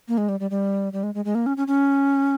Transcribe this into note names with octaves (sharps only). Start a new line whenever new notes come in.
A#3
G#3
G3
G3
G3
G3
G#3
G#3
G#3
A#3
C#4
C#4
C#4